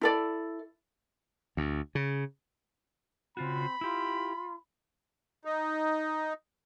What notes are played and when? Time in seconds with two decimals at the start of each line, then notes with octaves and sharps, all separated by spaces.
0.01 E4 A4 D5
1.57 D2
1.95 C#3
3.37 C#3 C4 F4 F#4 B5
3.81 E4 F4 G4
5.45 D#4